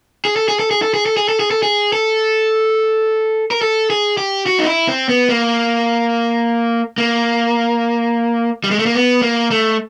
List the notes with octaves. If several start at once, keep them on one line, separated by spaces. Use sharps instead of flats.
G#4
A4
G#4
A4
G#4
A4
G#4
A4
G#4
A4
G#4
A4
G#4
A4
A#4
A4
G#4
G4
F#4
D#4
E4
C4
B3
A#3
A#3
G3
G#3
A3
A#3
B3
A#3
A3